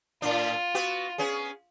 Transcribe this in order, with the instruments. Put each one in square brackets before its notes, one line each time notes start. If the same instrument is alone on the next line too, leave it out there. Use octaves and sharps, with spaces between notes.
[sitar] A2 D4 [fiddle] F4
[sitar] B3 F#4
B3 C#4 G#4